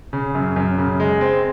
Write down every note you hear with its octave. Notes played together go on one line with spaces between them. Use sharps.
C#3
F#2
F#2
C#3
G#3
C4